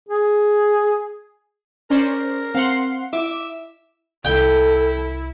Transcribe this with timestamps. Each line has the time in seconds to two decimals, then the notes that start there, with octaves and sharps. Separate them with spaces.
0.09 G#4
1.90 C#4 A#4 C5 D5
2.55 C4 F5 F#5 C6
3.13 E4 E5 D6
4.25 C2 E4 A4 G5